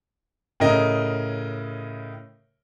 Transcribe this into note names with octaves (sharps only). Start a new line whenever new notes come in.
A2 C#3 A#4 D#5